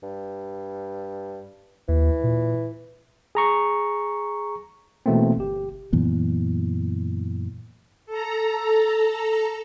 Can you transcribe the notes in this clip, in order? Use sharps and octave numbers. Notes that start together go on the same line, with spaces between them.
G2
D#2 E3
A#2
G#4 A#5 C#6
B2 E3 A3 A#3 C4
G1 G4
F#2 A#2 E3 B3
A4 A#5